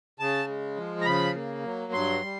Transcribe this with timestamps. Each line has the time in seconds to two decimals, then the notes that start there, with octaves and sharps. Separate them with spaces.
0.19 C#3 A5
0.47 G#3
0.77 F3
1.01 A#5
1.05 C#3 B5
1.35 A#3
1.64 F#3
1.93 G2 C6
2.22 G3